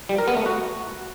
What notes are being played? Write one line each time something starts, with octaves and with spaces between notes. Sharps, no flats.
G3
A#4
B3
A3
F#4